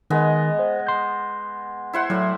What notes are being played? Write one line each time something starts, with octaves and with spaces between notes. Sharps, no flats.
D#3 G#3 B3 D#5
C5
C6 G6
E4 C5 F#5
A2 F#3 D5